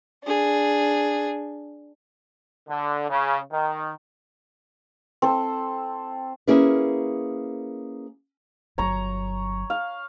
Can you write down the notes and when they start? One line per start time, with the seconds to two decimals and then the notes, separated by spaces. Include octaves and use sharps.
0.24 D4 G#4
2.69 D3
3.10 C#3
3.52 D#3
5.22 C4 A4
6.47 A#3 C#4 E4 G#4 A#4 B4
8.78 G1 F#3 C#5 A#5
9.70 F5